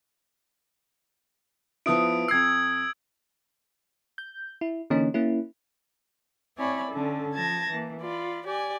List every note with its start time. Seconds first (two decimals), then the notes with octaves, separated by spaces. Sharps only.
1.86 F3 B3 E4 D#6 D7
2.28 F2 E6 G#6 C7
4.18 G6
4.61 E4
4.90 D3 E3 A#3 C#4 D#4
5.14 A#3 C#4 E4
6.57 C4 E4 C#5 D5 G#5 B5
6.90 D3 C#4 A4
7.33 F3 A5 G#6 A#6
7.70 E3 A#3
7.99 F4 D5 B5
8.46 G4 D5 G#5